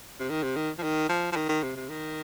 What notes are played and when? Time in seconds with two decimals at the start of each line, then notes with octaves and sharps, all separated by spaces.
0.20 C3
0.30 D#3
0.43 C3
0.56 D#3
0.78 F3
0.83 D#3
1.09 F3
1.32 F3
1.36 D#3
1.49 D#3
1.63 C3
1.76 C3
1.89 D#3